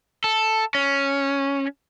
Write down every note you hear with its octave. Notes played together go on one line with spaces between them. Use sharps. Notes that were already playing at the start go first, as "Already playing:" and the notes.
A4
C#4